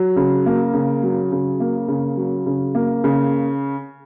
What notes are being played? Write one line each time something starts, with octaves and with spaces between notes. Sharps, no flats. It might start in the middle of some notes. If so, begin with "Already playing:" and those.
Already playing: F#3
C#3
A#3
C#3
F#3
C#3
A#3
C#3
F#3
C#3
A#3
C#3